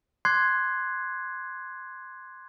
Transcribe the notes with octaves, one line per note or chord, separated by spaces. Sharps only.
C6 D6 F#6 G#6 C7